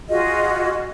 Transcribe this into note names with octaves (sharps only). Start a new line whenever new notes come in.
F4 F#4 G#4 D#5